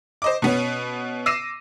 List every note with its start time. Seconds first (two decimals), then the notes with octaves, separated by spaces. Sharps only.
0.22 C5 D#5 D6
0.42 B2 B3 C#4
1.26 D6 E6 A#6 C7 D#7 E7